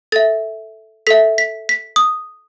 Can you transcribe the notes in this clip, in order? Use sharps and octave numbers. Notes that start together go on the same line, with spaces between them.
A4 E5 A6
A4 E5 B6
B6
B6
D#6